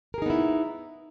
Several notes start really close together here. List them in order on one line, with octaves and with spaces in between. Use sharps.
A#4 G#4 D#4 B3 E4